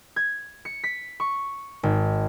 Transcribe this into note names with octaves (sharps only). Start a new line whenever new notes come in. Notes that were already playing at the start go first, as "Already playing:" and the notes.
G#6
C#7
B6
C#6
G#1